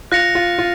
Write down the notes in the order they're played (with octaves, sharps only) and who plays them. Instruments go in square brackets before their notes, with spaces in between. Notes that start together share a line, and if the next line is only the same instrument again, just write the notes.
[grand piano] F4 [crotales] F#6 A#6 C#7 F7
[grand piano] F4
F4